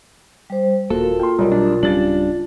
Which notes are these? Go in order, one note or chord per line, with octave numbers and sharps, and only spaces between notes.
G3 C5
D#1 A#3 F4 F#4 A4 A#4
F4 G5 C6
B1 G3 A#4
D4
D1 C#3 G3 D4 A6 F#7